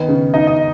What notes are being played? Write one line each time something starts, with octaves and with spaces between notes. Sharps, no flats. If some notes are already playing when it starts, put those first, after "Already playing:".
Already playing: D#3 B3
C#3
D#4 D#5
D#5